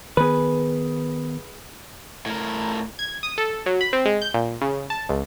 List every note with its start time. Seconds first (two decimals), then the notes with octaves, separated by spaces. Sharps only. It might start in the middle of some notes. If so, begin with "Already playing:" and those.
0.17 D#3 B3 G#4 B4
2.26 A2 A#4
2.99 G#6
3.23 D#6
3.38 A4
3.66 F#3
3.81 B5
3.93 C4
4.05 G#3
4.22 G6
4.34 A#2
4.61 C#3
4.90 A5
5.09 C#2